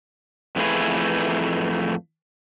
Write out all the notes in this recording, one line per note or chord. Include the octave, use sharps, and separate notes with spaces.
F2 A2 E3 A3 G#4 B4